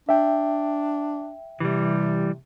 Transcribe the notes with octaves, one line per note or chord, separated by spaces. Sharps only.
D4 E5 G5
C3 E3 G3